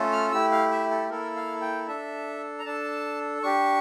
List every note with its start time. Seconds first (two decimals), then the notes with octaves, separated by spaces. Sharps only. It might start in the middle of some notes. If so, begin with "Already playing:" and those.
Already playing: A3 C#4 F4 A4
0.12 F6
0.32 A3 E4 G4 E6
0.51 F5
0.71 E5
0.91 A4
1.10 A#3 E4 A4 A#4
1.36 F5
1.61 G5
1.87 D4 A4 E5
2.59 A#5
2.65 D4 A4 A5
3.42 D4 G4 C#6